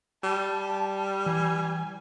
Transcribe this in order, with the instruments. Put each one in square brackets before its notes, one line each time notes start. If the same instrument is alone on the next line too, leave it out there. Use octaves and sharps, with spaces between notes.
[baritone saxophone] G3 [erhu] A5
[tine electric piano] E3 [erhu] G#5